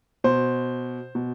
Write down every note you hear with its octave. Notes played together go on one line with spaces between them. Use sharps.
B2 C5
B2